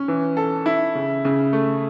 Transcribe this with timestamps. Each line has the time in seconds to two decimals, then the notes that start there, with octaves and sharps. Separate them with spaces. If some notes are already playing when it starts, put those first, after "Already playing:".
Already playing: C#4
0.08 E3
0.37 A4
0.66 E4
0.95 C#3
1.25 C#3
1.53 A3